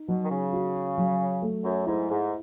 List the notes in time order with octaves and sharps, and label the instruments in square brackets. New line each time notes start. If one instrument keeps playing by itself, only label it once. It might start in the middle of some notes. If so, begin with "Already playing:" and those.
Already playing: [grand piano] D#4
[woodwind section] B2 [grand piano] F#3
[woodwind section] D#3
C#3
[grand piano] F#4
F#3
A3
[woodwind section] F#2
[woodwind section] G#2 [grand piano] E4
[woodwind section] G#2